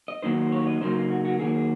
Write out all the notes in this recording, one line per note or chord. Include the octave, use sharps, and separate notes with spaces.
D#5
D#3 F#3 A#3 D#4 C5
C#5
D#5
C#3 F#3 A#3 D#4 C5
F4
F#4
F#4
D#3 F#3 A#3 G#4
G#4